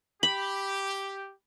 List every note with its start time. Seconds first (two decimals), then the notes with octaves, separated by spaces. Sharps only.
0.23 G4 B5